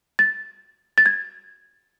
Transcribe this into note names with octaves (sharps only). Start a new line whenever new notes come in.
A6
A6
G#6